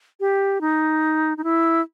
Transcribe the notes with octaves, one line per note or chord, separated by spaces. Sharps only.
G4
D#4
D#4
E4